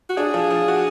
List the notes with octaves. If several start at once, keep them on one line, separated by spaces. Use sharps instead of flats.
F#4
D4 G#4
F3
F3
F#4